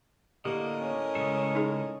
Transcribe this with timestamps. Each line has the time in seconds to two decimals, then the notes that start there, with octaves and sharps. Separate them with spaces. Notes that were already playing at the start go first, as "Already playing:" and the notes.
0.45 A2 D3 A#3 G4 A#4 D#5
0.78 C#4
1.15 C#3 G#3 A4
1.55 D#4 G#4